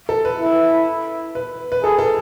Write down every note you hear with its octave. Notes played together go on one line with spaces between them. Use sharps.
A4
B4
E4
B4
B4
G#4 A4
A4